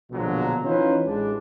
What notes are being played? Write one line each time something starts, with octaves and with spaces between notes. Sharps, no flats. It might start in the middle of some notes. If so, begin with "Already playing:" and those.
A#1 B2 D3 F3 F#3 G#3
E3 C#4 D#4 F4 B4 C5
A1 G#3 D4